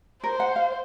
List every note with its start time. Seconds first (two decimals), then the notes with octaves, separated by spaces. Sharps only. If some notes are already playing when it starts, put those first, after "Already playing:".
0.24 A#4 C5
0.40 F#5
0.56 F5